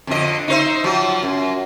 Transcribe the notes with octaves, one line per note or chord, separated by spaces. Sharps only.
F2 D3 D#5
D#4 C5 E5
F3 F#3
F#2